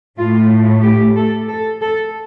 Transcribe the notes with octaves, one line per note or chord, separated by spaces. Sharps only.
A2 A3 F4
G4
A4
A4
A4